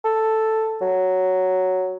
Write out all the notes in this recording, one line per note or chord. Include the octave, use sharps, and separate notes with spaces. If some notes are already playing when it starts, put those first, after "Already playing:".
A4
F#3